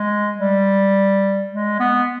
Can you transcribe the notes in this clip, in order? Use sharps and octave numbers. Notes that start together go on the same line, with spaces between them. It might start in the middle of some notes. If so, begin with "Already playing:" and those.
Already playing: G#3
G3
G#3
B3